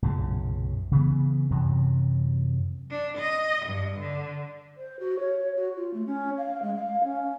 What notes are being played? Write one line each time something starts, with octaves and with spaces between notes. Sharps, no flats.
B1 F#2 A#2 C#3
C#3 E3 B3
F#2 C3 E3 F#3
D4
D#5
G2
D3
C5
F#4
C#5
F#4
F4
A3
C#4
F5
G#3
F5
C#4